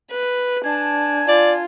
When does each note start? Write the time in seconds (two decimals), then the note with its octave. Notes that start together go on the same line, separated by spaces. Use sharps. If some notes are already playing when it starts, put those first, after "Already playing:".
0.11 B4
0.64 D4 G#5 A5 G#6
1.28 F4 D5